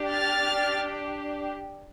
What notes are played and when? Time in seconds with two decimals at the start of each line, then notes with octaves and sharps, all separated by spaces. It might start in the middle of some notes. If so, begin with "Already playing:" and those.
Already playing: D4 G4
0.12 F6 A6